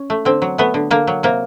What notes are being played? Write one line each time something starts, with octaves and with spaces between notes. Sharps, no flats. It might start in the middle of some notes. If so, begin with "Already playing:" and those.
Already playing: C#4
A3
D3 C4
F#3
A3 B3
D3
D3 A#3
F#3
C3 A#3